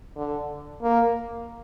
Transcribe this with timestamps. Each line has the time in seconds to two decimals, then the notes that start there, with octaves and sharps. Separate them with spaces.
0.17 D3
0.82 A#3